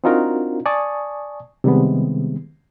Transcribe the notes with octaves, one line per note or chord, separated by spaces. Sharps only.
C4 D4 D#4 F4 F#4 A#4
D5 G#5 A5 C#6 D#6
C3 D#3 G3 G#3 B3